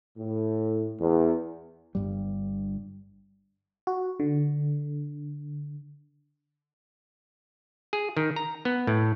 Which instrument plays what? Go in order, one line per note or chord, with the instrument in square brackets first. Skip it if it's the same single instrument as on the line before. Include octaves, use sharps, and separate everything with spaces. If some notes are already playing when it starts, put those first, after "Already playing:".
[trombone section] A2
E2
[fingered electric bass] G1 G2 G3
[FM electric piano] F#4
D3
[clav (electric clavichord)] G#4
D#3
A#5
B3
A2